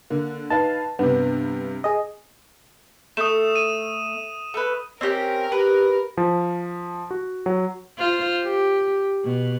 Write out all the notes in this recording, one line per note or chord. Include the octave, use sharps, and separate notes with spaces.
D3 A#3
D#4 B4 F5 A5
G2 C3 B3
G#4 D#5
A3 D#6 E7
D#7
A3 B4
C4 C#4 G4 A#4
G4 B4
F3
F#4
F#3
F4 C5
G4
B2